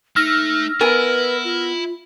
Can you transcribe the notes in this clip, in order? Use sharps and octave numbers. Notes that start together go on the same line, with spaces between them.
A3 D#4 E6 F6 A#6
B3 E4 A#4 B4 G#5
F4